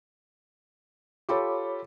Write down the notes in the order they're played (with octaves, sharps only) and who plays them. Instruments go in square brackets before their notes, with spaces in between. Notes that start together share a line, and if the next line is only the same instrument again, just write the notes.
[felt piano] F4 G4 A4 [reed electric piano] C#5 B5 D6